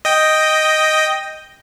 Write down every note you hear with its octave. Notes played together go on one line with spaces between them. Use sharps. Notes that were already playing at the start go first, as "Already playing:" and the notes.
D#5 G5